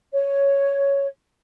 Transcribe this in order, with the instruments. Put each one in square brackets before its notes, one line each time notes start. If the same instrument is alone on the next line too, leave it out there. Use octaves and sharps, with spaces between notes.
[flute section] C#5